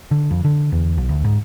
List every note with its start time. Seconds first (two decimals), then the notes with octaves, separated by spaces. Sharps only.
0.11 D3
0.31 F2
0.45 D3
0.72 E2
0.97 B1
1.09 D2
1.24 G#2